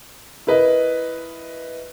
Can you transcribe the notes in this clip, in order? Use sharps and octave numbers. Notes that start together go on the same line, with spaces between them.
E4 A#4 B4 D#5